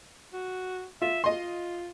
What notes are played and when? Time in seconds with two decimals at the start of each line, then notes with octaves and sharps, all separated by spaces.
0.33 F#4
1.02 F4 E5
1.24 F4 D#5 C6